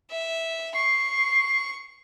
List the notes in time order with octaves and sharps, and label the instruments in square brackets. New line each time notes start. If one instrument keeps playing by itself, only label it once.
[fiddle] E5
[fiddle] C#6 [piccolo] C7